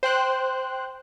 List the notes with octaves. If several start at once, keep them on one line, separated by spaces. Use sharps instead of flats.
C5 G5 F#6